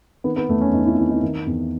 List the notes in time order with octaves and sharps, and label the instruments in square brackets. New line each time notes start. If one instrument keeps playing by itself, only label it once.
[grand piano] D#3 B3
B3
E2 A3
C#4
E2 D#4
E4
D#3 E4
D#4
D#3
E2